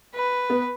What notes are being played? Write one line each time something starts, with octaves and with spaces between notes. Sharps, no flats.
B4
B3